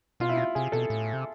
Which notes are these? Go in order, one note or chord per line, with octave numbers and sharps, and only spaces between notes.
B2 F4
E4
F4
C3 G#4
B2 A4
A2
C3